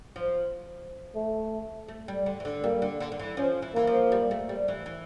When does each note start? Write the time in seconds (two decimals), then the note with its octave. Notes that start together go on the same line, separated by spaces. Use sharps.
0.16 F3
1.15 A3
1.88 A3
2.08 G3
2.26 D3
2.40 E3
2.45 D3
2.63 G3 A#3
2.82 D3
3.00 D3
3.12 D3
3.19 E3
3.37 F3 C#4
3.62 E3
3.75 E3 A#3
3.87 F3
4.12 G3
4.31 A3
4.49 G3
4.68 E3
4.86 E3